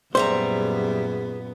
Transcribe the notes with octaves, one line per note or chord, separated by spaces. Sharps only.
F#2 A#2 G3 B3 G#4 C5 E5 A#5